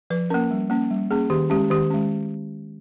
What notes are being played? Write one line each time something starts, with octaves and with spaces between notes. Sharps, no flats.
F3 B4
A#3 C#4 A#4
G3
A#3 C#4
G3
A#3 C#4 G#4
D#3 G4
G#3 C#4 G4
D#3 G4
G#3 C#4